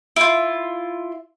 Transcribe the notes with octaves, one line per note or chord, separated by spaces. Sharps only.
E4 F4